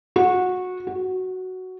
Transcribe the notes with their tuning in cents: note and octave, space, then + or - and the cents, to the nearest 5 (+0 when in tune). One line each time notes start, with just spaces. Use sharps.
F#4 -20
F#4 +5